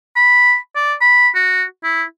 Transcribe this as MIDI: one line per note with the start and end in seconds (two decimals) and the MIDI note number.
0.16 0.56 83
0.76 0.94 74
1.01 1.29 83
1.35 1.64 66
1.84 2.04 64